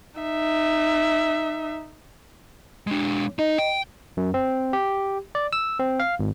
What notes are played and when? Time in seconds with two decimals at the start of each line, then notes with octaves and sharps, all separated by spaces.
0.20 D#4 E5
2.87 G#3 D4
3.39 D#4 D#5
3.59 G5
4.17 F#2
4.34 C4
4.73 G4
5.35 D5
5.53 E6
5.80 C4
6.00 F5
6.19 G#1